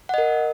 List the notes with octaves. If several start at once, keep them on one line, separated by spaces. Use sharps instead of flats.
A#4 D#5 F#5